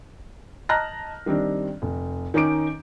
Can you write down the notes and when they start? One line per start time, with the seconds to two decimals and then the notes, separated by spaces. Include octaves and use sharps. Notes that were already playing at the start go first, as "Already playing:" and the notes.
0.69 D#5 A5 A#5 F6 F#6 A#6
1.26 D#3 G3 C4 D4
1.82 F1
2.34 D#3 C#4 D#4 D6 D7